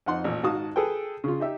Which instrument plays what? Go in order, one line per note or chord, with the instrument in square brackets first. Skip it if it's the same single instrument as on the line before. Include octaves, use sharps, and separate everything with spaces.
[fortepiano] F2 D#4 F#5 C6
A1 A#2
G#2 D#3 F#4 F5 A5 D#6
G#4 A4 B4 G5
C#3 F4
D#4 G4 E5